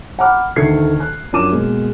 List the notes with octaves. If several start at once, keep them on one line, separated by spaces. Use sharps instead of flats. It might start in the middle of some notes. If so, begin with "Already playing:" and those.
F#5 A#5 B5 D6 F6
D2 D#3 A3 G#6 C7 C#7
F#6
F#2 F3 D4 D6 D#7 E7
B2 G#3 A#3